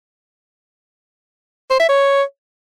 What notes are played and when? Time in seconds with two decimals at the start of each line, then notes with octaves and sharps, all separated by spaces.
1.70 C5
1.80 E5
1.89 C#5